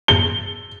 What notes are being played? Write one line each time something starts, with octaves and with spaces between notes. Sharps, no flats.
G7